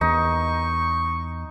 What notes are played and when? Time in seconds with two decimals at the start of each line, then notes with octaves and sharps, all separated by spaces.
0.01 E2 D#4 C#6